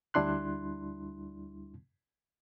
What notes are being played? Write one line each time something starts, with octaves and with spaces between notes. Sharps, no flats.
D2 G3 D4 E4 C6 F#6